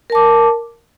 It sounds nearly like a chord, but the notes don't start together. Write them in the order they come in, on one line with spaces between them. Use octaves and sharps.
A#4 A5 D6